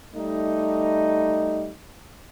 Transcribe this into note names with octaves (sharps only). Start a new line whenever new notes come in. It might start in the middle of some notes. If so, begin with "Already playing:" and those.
G3 A3 D#4